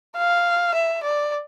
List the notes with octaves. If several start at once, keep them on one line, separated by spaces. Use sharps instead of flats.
F5
E5
D5